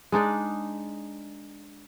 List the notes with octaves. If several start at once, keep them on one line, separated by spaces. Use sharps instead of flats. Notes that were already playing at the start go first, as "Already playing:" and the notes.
G#3 D4 D#4 D5